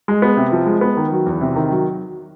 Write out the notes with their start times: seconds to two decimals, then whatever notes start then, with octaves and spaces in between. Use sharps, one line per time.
0.08 G#3
0.22 B3
0.37 C3
0.52 F3
0.66 G#3
0.81 B3
0.97 D#3
1.12 F#3
1.26 E2
1.41 C3
1.56 D#3
1.71 F#3